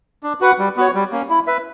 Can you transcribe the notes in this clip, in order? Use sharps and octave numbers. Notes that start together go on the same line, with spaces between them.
D4
F#4 B4 F#5
G3
B3 F#4 C#5
G3
A#3 C#4
E4
B4 E5